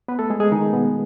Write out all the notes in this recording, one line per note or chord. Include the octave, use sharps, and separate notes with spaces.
B3 B4
A3 A4
G#3 G#4
G#3 G#4
D#3 D#4
B2 B3